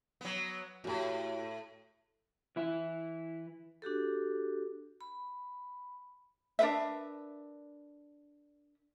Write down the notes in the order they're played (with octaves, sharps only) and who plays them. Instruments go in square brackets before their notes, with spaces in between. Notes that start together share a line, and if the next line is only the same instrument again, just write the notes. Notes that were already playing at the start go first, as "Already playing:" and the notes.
[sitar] F#3 B3
[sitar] F2 A2 [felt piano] F#4 G4 B5
[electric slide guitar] E3 E4
[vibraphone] D4 F#4 G4 A4
B5
[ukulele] D4 A#4 B4 E5